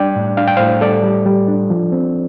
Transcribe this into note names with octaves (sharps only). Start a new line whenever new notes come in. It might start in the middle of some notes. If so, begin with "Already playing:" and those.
Already playing: G3 D4 D5 G5
A2
D4 F5
G5
A2 C5 F5
G3 A4 D5
G3
G3
D4
F3
C4